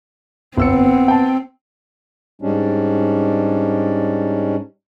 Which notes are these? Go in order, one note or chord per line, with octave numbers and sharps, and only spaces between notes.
G1 B3 C4 E6 C#7
G5 A5
G#2 G3 G#3 C#4 D4